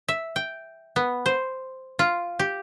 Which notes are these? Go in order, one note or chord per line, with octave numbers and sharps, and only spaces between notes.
E5
G5
B3
C5
F4
G4